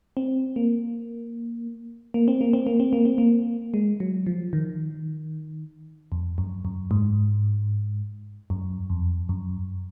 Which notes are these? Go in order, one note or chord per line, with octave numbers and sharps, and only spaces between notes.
C4
A#3
A#3
C4
A#3
C4
A#3
C4
A#3
C4
A#3
G#3
F#3
F3
D#3
F2
F#2
F#2
G#2
F#2
F2
F#2